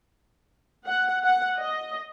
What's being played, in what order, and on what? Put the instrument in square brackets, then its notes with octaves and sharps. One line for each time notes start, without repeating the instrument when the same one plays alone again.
[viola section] F#5
F#5
D#5